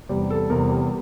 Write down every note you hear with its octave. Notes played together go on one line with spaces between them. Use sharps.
E2 C3 G3 G4
A4
E2 C3 G3 A#4
G4